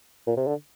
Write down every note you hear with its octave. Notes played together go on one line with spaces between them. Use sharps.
A#2
C3
D3